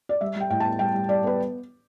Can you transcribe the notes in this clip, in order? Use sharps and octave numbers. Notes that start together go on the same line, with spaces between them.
D5
G3 E5
G3 G5
A2 G5
A5
B3
G3 G5
G3
G3 D5
B3 B4